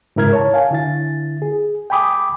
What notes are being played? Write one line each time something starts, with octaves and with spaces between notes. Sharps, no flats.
G#2 C#3 E4 A#4 F6 G#6
C#5 A5
F5 G#5
D3 E4 A6
G#4
G5 G#5 B5 D6 D#6